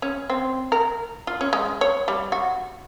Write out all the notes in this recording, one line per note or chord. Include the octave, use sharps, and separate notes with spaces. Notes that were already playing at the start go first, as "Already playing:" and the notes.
C#4
C4
A#4
F4
C#4
G#3
C#5
G3
F#4